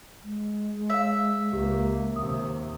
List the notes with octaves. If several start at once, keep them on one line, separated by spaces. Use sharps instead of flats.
G#3
C#5 E5 F5
C#2 A#3 G4
D#2 C3 D#6